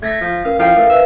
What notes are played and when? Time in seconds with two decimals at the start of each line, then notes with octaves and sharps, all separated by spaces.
0.02 A3 G#6 A#6 B6
0.21 F3
0.45 C#4 A#4 F5
0.59 F3 E4 A4 F5 G5
0.76 A3 A4 A#4
0.90 B4 C5 E5